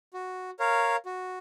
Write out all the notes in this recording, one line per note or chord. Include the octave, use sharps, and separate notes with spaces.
F#4
A#4 C#5 F5
F#4